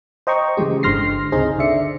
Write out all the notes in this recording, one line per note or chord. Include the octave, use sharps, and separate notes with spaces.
C5 D#5 G5 A#5 C#6
C#3 E3 F3 G#3 G4
G1 D3 C6 F6 A#6 C7
C#2 C3 D#4 G#4 C5
D3 D5 E5 C#7